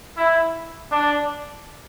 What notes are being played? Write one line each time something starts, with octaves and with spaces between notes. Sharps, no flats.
E4
D4